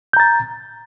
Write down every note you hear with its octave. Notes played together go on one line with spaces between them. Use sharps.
A#5 G6 A6